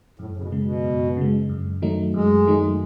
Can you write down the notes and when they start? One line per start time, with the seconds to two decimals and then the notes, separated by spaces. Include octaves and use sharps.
0.19 F#2 A2
0.37 C#3
0.41 B2
0.52 C#3 G#3
0.63 B2
0.84 F#2
1.17 C#3 G#3
1.49 F#2
1.82 D#3 F#3 A3 D#4
2.14 F#2 G#3
2.47 D#3 F#3 A3 D#4